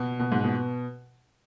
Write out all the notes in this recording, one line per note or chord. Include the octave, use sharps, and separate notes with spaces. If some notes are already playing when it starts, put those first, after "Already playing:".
Already playing: B2
B2
G#2
B2